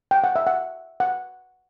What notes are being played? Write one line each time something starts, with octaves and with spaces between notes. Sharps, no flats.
G5
F#5
E5
F#5
F#5